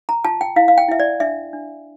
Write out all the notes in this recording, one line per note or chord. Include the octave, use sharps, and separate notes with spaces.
A#5
F4 A5
G5
E4 F5
F5
G5
E4 E5
D5
D4 E5
D4